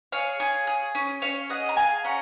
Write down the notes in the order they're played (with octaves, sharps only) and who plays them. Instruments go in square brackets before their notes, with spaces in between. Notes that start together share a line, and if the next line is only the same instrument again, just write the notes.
[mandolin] G#4 C#5 F5
G#4
G#4
C#4
C#4 C#5 F5
G#4 D#5 F#5
A#5
G#4 F5 G#5
C#4 F#5 A#5